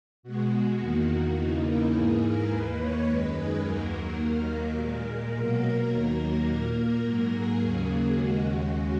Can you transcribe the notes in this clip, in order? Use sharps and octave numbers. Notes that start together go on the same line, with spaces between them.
B2 G#3 F#4
E2 D#3 A#3
E2 C#3 E3 A#3 D#4
E4
G#2 E3 A#3 G#4
A#4
D#2 D#3 A#3 B4
C#5
F#2 D#3 G#3 B4
G#4
D#2 D#3 F#3 A#3 A#4
D#2 D#3 F#3 A#3
A#2 G#3
B2 F#3 A#3 A#4
D#2 D#3 F#3 A#3 A#4
A#2 A#3
G#2 F#3 A#3 A#4
G#4
D#2 C#3 F#3 A#3
D#2 C#3 G#3 F#4